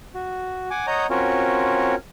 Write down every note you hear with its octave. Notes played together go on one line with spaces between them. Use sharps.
F#4
F#5 G#5 D6
C#5 D#5 F#5 A#5 D#6 G6
C4 C#4 F4 F#4 A#4 C#5